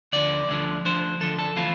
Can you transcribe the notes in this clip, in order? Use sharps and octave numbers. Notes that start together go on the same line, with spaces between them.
D2 D3 F3 D5
D2 D3 F3
D2 D3 F3 C5
D2 D3 F3 A4
A4
E3 A3 C4 E4 F4